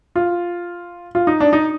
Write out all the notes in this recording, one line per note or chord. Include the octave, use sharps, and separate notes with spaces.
F4
F4
D#4
D4
D#4